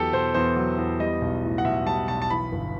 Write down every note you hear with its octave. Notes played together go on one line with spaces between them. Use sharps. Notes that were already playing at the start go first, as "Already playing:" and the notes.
Already playing: E2 F#3 G4 A4
B2 C5
E2 C5
F#3
E2
G3 D#5
B1
A2
F#5
B1 E5
G3 A5
B1 A5
A5
E3 B5
G1